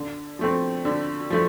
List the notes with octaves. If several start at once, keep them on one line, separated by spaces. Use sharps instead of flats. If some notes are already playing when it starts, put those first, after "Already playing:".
Already playing: D3
F3 A3 C4
D3
F3 A3